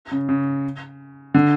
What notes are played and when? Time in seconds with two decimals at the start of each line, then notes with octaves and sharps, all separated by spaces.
0.11 C#3
0.29 C#3
1.34 D3